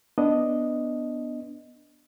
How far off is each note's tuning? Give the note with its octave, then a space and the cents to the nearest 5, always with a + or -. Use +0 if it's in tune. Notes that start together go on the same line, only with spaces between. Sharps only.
B3 -5 D4 +0 D#5 +0